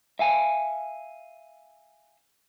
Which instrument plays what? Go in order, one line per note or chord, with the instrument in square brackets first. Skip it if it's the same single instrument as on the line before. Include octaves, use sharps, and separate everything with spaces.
[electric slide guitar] E5 F5 G#5